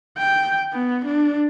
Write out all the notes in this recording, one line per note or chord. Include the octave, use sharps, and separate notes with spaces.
G5
B3
D4